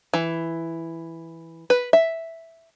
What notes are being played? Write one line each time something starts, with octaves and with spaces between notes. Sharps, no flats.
E3
B4
E5